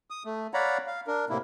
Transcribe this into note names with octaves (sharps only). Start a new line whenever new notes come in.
D#6
A3
C#5 D5 F5 F#5 A#5 B5
F5
D4 A#4
A2 C3 A#3 E4